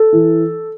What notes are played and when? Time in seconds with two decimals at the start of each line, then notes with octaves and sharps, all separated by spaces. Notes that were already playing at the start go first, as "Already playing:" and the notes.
Already playing: A4
0.12 E3